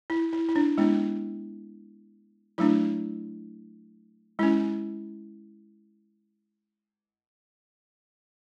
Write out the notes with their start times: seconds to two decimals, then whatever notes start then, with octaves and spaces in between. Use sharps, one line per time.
0.10 E4
0.33 E4
0.49 E4
0.56 D4
0.78 G#3 B3 D4 E4
2.58 F#3 A3 D4 E4
4.39 G#3 C#4 E4